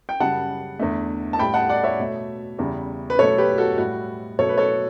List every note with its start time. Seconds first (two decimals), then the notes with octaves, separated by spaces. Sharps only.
0.09 G5
0.20 F#2 C#3 G3 F#5 A5
0.80 E2 D3 A3
1.33 A5
1.39 A2 G3 G5 B5
1.54 F#5 A5
1.69 D5 F#5
1.84 C#5 E5
1.99 B2 A3
2.58 E2 C#3 G3
3.10 B4
3.19 B2 F#3 A3 A4 C#5
3.38 G4 B4
3.58 F#4 A4
3.78 A2 G3 F#4
4.39 B2 F#3 A3 A4 C#5
4.49 B4
4.58 A4 C#5